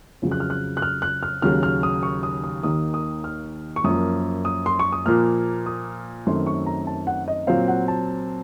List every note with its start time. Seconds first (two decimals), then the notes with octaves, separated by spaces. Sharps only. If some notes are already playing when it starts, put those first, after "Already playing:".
0.22 F2 C#3 F#3
0.31 F#6
0.40 F6
0.50 F#6
0.77 F#6
0.82 F6
1.02 F#6
1.23 F6
1.42 D#2 C#3 F#3 F6
1.63 F6
1.83 D#6
2.03 C#6
2.23 D#6
2.44 D#6
2.63 D#2 D#3 A#3 D#6
2.94 D#6
3.24 F6
3.76 C#6
3.84 F#2 F3 A#3 D#6
4.45 D#6
4.66 C6
4.79 C#6
4.92 D#6
5.06 A#2 F3 A#3 F6
5.66 D#6
6.26 F#2 D#3 F#3 A3 C4 C6
6.47 C#6
6.66 A#5
6.87 A5
7.07 F#5
7.28 D#5
7.47 A#2 F#3 C4 F5
7.68 F#5
7.88 A5